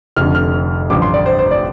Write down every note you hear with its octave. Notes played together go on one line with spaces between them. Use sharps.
F1 F2 D3 F6
F6
A1 G2 D3 F3 D6
C6
D5
C5
C5
D5